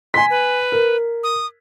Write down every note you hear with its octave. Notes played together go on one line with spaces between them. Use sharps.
G#5 C6 B6
B4
A#4
D#6